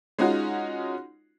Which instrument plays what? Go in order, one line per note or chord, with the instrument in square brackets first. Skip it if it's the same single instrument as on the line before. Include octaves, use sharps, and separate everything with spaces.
[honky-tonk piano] G#3 C#4 D#4 F4 F#4